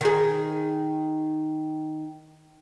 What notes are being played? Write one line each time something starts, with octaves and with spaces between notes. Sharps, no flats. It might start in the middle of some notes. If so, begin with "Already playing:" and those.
D#3 G#4